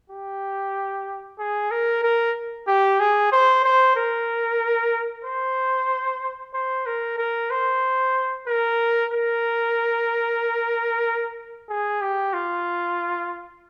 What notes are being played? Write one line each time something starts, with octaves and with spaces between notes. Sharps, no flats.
G4
G#4
A#4
A#4
G4
G#4
C5
C5
A#4
C5
C5
A#4
A#4
C5
A#4
A#4
G#4
G4
F4